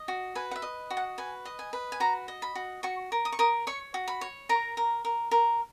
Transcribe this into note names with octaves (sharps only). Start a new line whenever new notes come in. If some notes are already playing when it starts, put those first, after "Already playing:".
Already playing: D#5
F#4
B4 G#5
F#5
E5
D#5
F#4
F#5
B4 G#5
D#5
G#5
B4
G#5
F#4 A#5
D#5
B5
F#4
F#4 C#6
A#4
D#6
C#6
A#4 D#6
C#5 C#6
F#4
B5
C#5
A#4 A#5
A#4
A#4
A#4